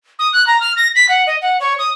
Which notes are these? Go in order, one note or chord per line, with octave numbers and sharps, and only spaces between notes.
D#6
F#6
A#5
F6
A#6
B6
F#5
D#5
F#5
C#5
D#6